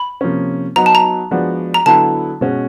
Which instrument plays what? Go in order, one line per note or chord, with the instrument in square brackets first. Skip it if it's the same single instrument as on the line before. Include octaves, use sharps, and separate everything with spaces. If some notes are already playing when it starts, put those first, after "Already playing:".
Already playing: [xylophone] B5
[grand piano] C3 F3 A#3 C#4
[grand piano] F#3 B3 D#4 [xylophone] A#5
[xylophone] A5
A#5
[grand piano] F3 G#3 B3 D4 F#4
[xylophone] A#5
[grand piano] D3 F#3 B3 E4 [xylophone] A5
[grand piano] B2 G#3 C#4 F#4